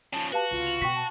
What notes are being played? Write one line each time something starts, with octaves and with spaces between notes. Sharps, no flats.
C#3 F3 A5
F#4 G4 B4 F5 A5
C#2 C3 F4
F7
B2 G5 C#6 B6
A5